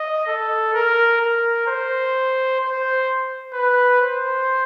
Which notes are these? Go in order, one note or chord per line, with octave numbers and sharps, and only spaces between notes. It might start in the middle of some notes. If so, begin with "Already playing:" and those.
Already playing: D#5
A4
A#4
A#4
C5
C5
B4
C5